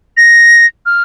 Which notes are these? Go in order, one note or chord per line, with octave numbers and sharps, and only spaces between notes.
A#6
F6